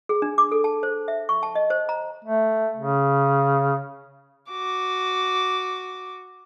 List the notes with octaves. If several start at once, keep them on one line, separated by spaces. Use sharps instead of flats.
G#4
D4
D6
A4
A5
C5
E5
C#6
A5
D#5
C5
A#5
A3
C#3
F#4 D6